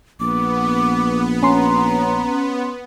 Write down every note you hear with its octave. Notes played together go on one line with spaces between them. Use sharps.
A#1 B3 D6
C#4 A#5 C6